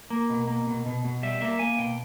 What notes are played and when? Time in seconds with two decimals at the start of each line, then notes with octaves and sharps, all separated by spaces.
0.10 A#3
0.30 B2
0.48 A#3
0.67 B2
0.86 B2
1.05 B2
1.23 G3 E5
1.41 A#3 E5
1.59 A#3 G#5
1.78 B2 G5